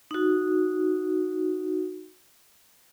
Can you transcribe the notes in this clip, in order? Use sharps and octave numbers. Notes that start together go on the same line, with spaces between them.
D#4 F#4